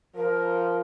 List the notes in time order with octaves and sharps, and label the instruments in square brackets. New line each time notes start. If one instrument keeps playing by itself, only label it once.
[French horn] F3 [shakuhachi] A#4